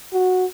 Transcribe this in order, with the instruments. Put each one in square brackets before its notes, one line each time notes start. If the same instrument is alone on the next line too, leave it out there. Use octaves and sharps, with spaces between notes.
[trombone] F#4